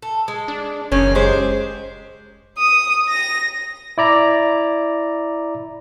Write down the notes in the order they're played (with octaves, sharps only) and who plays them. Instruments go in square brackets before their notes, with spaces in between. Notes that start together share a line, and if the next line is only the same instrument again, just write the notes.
[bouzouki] A4
G#3
[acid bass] D4
[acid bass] F#1 [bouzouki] D#3 G#4 [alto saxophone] C#4
[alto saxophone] G#3 [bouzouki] G4 C5
[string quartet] D#6
A#6
[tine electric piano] E4 D5 A#5